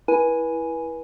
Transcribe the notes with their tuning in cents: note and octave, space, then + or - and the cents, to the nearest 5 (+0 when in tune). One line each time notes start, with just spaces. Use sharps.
E4 +0 B4 -30 G#5 +5